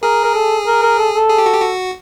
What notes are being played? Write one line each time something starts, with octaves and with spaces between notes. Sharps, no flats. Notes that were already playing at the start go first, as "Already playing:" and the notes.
G#4 A#4
A#4
A4
A#4
A#4
A4
A4
G#4
G4
F#4
G4
F#4